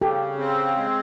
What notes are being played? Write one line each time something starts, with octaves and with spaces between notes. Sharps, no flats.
C#3 G4 A4
C4
G#3